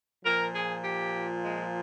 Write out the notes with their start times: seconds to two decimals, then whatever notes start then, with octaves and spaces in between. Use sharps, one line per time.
0.24 A#2 F3 A#4
0.54 G#4
0.83 G4
1.43 G#3